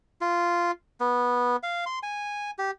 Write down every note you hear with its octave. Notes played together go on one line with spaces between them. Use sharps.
F4
B3
F5
C6
G#5
G4